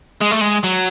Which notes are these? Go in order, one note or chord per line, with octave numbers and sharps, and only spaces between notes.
G#3
A3
G#3
F#3